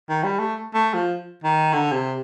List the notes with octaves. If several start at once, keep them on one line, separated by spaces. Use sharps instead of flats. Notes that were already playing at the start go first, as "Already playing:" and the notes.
D#3
G3
A3
A3
F3
D#3
D3
C3